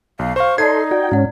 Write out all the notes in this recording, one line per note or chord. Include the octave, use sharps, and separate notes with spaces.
B1 F5
C5 F5 C#6
D#4 A4 C#5 D5 C6 G#6
F#4 D5 G5
G#2 C#4 E4 F#5